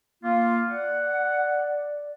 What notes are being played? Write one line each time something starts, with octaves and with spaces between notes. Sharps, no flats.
A#3 F4
D5 F#5